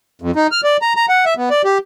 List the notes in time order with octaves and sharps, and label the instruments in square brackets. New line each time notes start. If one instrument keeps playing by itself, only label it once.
[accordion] F2
D#4
F6
D5
A#5
A#5
F#5
E5
B3
D5
G4